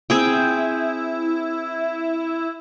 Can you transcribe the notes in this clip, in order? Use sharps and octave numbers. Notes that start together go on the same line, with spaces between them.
C4 E4 G#4 G5